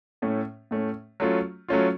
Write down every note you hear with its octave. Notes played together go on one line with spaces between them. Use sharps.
A2 A3 C#4
A2 A3 C#4
F#3 A3 C#4 F4
F#3 A3 C#4 F4